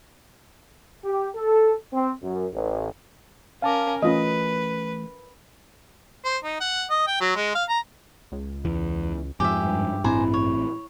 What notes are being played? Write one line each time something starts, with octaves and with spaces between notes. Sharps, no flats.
G4
A4
C4
F#2
A1
C#4 A#4 F5 A5 D6
E3 A3 C#4 F4 B4 D#5
C5
D#4
F#5
D#5
G5
F#3
G#3
F5
A#5
C#2
E2 E3
F2 G#2 F3 G4 E5 G#5
G2
A1 A2 C4 E4 C5 G#5 A#5
C#5